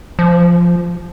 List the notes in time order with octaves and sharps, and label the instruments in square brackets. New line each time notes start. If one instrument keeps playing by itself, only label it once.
[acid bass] F3